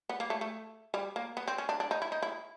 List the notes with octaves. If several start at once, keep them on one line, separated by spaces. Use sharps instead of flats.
B3
A#3
A3
A3
G3
A#3
B3
C4
C#4
D4
D4
D#4
E4
D#4
E4